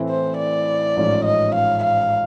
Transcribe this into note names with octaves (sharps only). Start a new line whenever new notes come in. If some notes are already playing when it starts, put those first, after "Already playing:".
Already playing: A2 E3 A3 C4 E4
C5
D5
A1 G#2 F3 A3 C#4
D#5
F5
F5